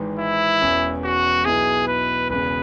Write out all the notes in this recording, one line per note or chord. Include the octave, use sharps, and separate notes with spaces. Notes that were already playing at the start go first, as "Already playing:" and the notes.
Already playing: G#1 G#2 E3
E4
E1 E2 E3 C#4
F#4
B1 B2 B3 E4 G#4
B4
E1 E2 C#3 B4